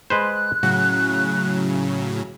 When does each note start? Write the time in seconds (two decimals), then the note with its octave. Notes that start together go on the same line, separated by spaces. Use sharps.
0.10 G#3 B4 C5 F#6
0.63 A2 C#3 F#3 F#4